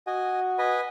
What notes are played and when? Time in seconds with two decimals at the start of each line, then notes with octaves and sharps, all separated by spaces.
0.07 F#4 D#5 G#5
0.58 B4 D#5 G#5